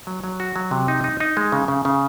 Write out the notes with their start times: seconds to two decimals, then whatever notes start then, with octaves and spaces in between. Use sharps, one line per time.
0.07 F#3
0.24 F#3
0.40 F#4
0.56 F#3
0.71 C3
0.88 D#4
1.04 D#4
1.20 D#4
1.37 G#3
1.52 C#3
1.68 C#3
1.85 C#3